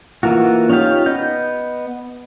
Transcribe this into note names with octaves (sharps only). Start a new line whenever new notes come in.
E3 A#3 F4 F#4
C#4 D#4 F4 G4 F5
B3 D#5 G6